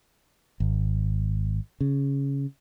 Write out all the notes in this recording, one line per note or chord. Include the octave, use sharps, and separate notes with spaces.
G#1
C#3